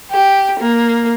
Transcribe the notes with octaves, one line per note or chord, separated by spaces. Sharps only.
G4
A#3